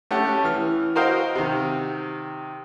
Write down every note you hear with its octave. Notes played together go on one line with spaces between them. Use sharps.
A3 C#4 G4 F#5
E3 F6
F#4 A#4 C5 D#5 F5 G5
C3 D#3